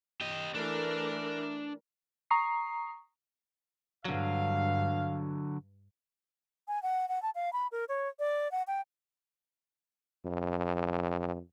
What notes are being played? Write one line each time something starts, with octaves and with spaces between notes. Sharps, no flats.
G4 D#5
E3 A3 D4 A#4
A#5 C#6 D#6 C7
G2 D3 F#3 F5
G#5
F#5
F#5
A5
F5
B5
A#4
C#5
D5
F#5
G5
F2